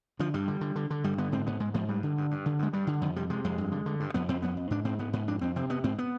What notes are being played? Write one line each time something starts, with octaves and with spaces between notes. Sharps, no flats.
D3 F3
G2 G3
D3
D3
D3
D3
G2 G3
D3 B3
G#2 C4
G#2 B3
G#2 G#3
G#2 F3
G2 G3
D3
G2
G2
D3
G2 G#3
G2 G3
D3
F2 D#3
C3 G3
C3 G#3
F2 G#3
G2
D3
D3
G2
F2 B3
F2 C4
F2 B3
F2
G#2 D4
G#2 C4
G#2 B3
G#2 B3
F2 D4
F2 C4
C3 C4
C3 B3
G#2 C4
B3